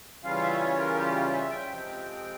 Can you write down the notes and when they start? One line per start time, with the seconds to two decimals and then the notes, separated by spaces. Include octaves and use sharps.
0.23 C#3 E3 G3 C#4 F4 F5
0.36 C#5
0.41 E5
0.59 C#5
0.78 A#4
0.96 G4
1.32 E5
1.50 G5
1.69 F2 C3 F3 G#3 C4 G5